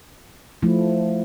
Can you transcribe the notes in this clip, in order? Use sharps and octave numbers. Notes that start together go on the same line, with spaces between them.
F3 A3 E4